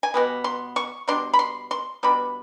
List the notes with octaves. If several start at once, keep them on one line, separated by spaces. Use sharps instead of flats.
G#5
B2 G3 B3
C6
C#6
B2 G3 B3 D4 C6
B5
C6
C6
B2 G3 B3 D4 B5